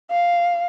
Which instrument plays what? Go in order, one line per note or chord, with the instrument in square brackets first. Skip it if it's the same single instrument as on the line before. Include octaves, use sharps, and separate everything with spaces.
[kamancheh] F5